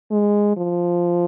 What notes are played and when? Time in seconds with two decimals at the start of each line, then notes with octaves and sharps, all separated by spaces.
0.11 G#3
0.57 F3